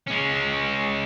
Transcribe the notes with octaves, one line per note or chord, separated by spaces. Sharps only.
G#3 C#4